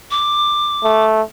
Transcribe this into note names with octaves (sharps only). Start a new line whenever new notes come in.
D6
A3